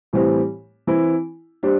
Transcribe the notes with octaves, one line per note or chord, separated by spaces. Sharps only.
A2 E3 G3 C4 G4
E3 C4 E4
G3 D4 G4 C5